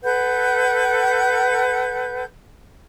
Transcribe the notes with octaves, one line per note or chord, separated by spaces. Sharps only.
A4 B4 F#5 G6